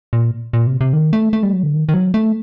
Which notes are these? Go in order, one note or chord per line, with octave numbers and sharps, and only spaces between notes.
A#2
A#2
C3
C3
D#3
A3
A3
G3
F#3
D3
D#3
D#3
F#3
A3